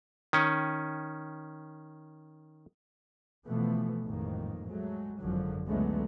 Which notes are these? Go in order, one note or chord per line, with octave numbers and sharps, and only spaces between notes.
D#3 C#4
B2 E3 F3 A3 B3
A1 F2 G#2 D#3 A#3
F#3 G#3 A3
G#1 F#2 D3 F3 F#3
C#2 D3 F#3 G#3 A3 B3